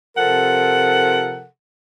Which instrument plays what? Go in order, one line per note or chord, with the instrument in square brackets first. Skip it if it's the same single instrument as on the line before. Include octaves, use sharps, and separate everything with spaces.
[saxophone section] C3 F3 A4 A#4 F#5